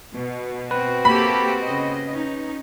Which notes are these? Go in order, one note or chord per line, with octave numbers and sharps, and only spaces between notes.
B2
C4 F#4 B4
A#3 G4 A4 B5
C#3 D#5
C#4 D#4